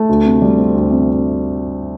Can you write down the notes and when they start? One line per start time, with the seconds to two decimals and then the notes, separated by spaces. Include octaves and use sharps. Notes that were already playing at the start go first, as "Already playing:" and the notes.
Already playing: A3
0.09 D2
0.25 C3
0.42 G3
0.58 C4
0.75 D2
0.91 C3